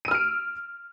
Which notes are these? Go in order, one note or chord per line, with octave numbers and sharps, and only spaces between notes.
E6 F6 D7 D#7